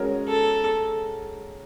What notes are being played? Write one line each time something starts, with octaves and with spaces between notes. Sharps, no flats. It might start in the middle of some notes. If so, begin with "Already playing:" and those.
Already playing: G#3 C#4 F#4 A#4 C#5
A4